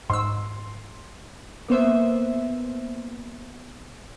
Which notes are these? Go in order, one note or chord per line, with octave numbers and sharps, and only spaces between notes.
G#2 C6 E6
A#3 B3 C5 E5